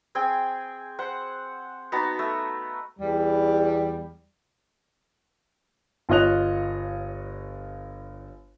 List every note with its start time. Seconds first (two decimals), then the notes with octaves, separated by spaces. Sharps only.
0.15 C4 G#4 G5 G#5
0.99 C5 F#5
1.92 B3 D#4 F#4 A5
2.19 A3
2.99 E2 G3
6.09 G1 F4 C#5 D#5 F#6 F7